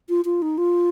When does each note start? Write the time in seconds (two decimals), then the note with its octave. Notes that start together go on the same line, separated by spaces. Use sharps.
0.09 F4
0.25 F4
0.42 D#4
0.58 F4